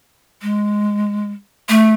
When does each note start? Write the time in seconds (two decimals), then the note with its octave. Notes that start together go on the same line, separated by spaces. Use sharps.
0.42 G#3
1.69 A3